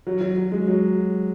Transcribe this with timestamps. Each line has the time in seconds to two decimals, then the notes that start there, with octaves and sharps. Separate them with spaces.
0.07 F#3
0.21 F#3
0.37 F#3
0.52 G#3
0.68 F#3